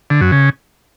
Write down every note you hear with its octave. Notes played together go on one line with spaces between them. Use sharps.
D3
F#2
C#3